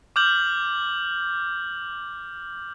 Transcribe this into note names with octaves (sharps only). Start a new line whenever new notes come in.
D6 F6 G6 F#7